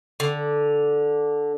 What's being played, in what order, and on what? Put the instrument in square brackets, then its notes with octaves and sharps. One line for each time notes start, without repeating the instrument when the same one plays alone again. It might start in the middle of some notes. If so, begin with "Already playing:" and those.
[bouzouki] D3